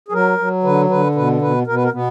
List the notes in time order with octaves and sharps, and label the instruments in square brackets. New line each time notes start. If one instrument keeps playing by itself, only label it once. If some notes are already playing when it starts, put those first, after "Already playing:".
[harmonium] G#4
F#3 A#4
F#3
D3 B4
D3 B4
B2 B4
B2 B4
B2 A#4
B4
A#4
B2 B3